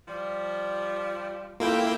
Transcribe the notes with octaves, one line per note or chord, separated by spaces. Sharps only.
F3 G3
A#3 E4 F4 A4 F5 G5